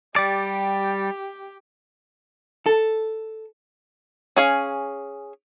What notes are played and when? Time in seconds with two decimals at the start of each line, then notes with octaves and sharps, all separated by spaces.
0.16 G3 G4 D5
2.66 A4
4.36 C#4 G#4 F5